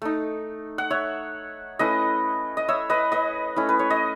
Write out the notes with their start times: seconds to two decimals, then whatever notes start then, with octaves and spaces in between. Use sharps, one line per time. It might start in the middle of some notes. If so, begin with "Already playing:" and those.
0.02 A3 D#4
0.78 F#5
0.91 C#5 E5
1.79 A3 C#4 E4 B4 D#5
2.57 D#5
2.68 C#5 E5
2.90 B4 D#5
3.12 B4 D#5
3.56 A3 C#4 E4
3.69 B4
3.79 C#5
3.90 D#5